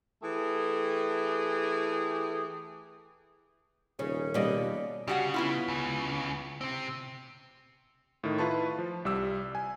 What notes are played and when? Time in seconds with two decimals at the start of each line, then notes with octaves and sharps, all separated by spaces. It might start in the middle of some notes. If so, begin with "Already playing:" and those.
0.23 E3 A3 G4 G#4
3.99 D#1 C#3 C#4
4.34 B2 G3 A#3 D5 D#5
5.08 C#3 G3 F#4 F#5
5.34 B3 E4 F4
5.68 C#2 C#3
6.61 C3 C4
8.24 A2 D#3
8.38 E4 F4 B4 A5 C6 C#6
8.79 F3
9.05 C2 G3 D6 E6
9.55 G#5